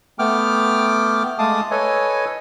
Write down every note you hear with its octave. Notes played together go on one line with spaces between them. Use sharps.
A3 B3 G5 D6 F6
G#3 A3 F5 A5 D6 D#6
A4 B4 C#5 D#5 G#5